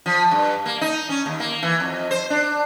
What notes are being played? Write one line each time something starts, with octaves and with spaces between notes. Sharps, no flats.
F3
G2
A#3
D#4
C#4
D#2
A#3
E3
F2
C5
D4